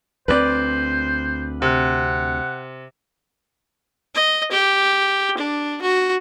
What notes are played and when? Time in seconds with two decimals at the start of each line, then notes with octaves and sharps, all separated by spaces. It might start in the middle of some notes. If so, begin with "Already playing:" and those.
0.28 D2 G3 C4 B4 C5 D5
1.62 C3 F#5
4.14 D#5
4.52 G4
5.38 D4
5.82 F#4